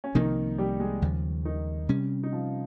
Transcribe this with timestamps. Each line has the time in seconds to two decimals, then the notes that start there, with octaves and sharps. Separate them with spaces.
0.04 C#4
0.15 C2 C3 D#3 F3 A#3 D#4
0.58 G3 G4
0.80 G#3 G#4
1.02 D#2 C#3 F3
1.45 D#3 D#4
1.89 C3 G3 C#4
2.23 D#4
2.32 F3 F4